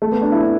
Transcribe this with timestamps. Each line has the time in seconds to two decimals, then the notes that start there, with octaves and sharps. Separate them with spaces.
0.02 A3
0.12 B3
0.22 D4
0.32 E4
0.42 D4